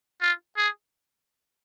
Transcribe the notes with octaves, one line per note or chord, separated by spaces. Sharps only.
F4
G#4